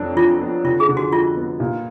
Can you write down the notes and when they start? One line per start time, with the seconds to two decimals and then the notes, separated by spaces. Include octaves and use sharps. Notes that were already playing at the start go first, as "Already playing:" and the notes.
Already playing: F2 F#3 D4
0.17 F3 F4
0.41 B3
0.64 D3 F4
0.80 G#4
0.89 D3
0.97 F#4
1.12 G#3 F4
1.36 B3
1.60 A#2